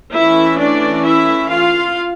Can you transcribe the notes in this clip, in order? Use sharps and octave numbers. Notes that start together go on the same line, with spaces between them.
E3 A3 C#4 E4 E5
D4 D5
E4 E5
F4 F5